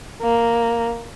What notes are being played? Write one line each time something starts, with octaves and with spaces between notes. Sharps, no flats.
A#3